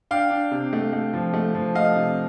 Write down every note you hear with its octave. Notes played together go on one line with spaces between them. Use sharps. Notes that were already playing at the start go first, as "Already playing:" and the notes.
D4 F5 G5
D4
C3
A3
A3
F3
A3
F3
A3 D#5 F5
C3